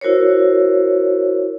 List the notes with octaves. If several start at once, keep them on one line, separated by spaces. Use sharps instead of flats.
E4 F#4 A#4 C5 C#5